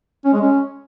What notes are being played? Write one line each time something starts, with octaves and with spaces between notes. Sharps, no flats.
C#4
G#3
C#4